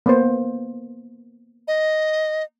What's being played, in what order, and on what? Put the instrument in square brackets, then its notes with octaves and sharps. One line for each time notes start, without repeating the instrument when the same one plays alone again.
[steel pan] A#3 B3 C5
[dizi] D#5